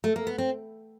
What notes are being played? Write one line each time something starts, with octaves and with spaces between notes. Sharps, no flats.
A3
A#3
B3
C4